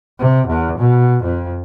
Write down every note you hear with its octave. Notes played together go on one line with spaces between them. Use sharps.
C3
E2
B2
F2